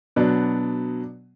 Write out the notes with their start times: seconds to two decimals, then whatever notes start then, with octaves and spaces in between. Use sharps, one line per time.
0.16 B2 F#3 B3 D4